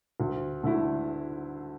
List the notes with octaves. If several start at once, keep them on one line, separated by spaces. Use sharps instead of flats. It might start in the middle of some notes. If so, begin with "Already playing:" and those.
D2
D3 A3 E4